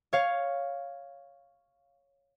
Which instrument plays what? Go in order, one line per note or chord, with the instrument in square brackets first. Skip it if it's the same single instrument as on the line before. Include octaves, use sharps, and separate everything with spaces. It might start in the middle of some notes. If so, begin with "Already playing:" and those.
[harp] C#5 F5